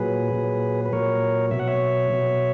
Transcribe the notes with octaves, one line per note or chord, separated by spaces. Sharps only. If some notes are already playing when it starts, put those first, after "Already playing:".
Already playing: A#2 F#3 G#4 B4
A#2 F#3
B4
A#2 F#3 A#4 C#5
B2 F#3 E5
F#5
C#5 E5
B2 F#3